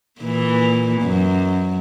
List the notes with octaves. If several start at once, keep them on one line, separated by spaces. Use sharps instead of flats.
A#2 E3
F#2